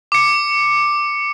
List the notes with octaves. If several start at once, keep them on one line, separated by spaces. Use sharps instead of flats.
D6 C#7